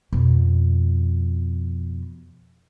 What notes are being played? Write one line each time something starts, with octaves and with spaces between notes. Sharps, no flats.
F2 B2